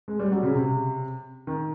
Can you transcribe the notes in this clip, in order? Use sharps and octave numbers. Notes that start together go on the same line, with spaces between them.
G#3
G3
F#3
C#3
C3
D#3